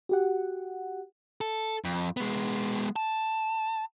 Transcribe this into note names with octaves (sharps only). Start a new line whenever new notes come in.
F#4 G4 F#5
A4
F2
G#3 B3
A5